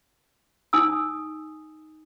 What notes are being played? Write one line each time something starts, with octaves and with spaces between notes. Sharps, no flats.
D#4 G#5 D#6 E6